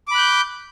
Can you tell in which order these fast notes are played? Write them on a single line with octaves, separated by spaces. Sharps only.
D6 B5 F#6 G6